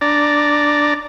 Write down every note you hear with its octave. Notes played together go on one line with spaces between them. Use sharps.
D4 D5 A#5